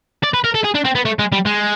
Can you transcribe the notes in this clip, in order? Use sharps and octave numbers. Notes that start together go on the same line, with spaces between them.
D5
B4
A#4
A4
G#4
D4
C4
B3
A3
G#3
G3
G#3